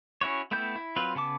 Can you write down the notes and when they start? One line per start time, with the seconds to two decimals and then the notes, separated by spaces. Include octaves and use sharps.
0.21 C#4 E4 F#4 C#5
0.51 A3 B3 E4 G5 G6
0.76 E4
0.96 F#3 C4 F4 B4
1.15 C#3 B3 A5 D6